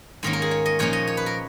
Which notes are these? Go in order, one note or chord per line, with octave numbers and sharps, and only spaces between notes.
G#2 D#3 A#3 C#4
A#4
G#4
C#5
D#5
A#2 F3 A#3 C#4 C#5
D#5
C#5
B4
A#4